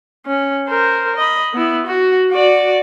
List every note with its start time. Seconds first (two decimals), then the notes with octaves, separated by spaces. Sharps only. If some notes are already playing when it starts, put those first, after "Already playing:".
0.27 C#4
0.68 A#4 C5
1.17 D#5 B5
1.54 B3 E4
1.86 F#4
2.32 F#4 D5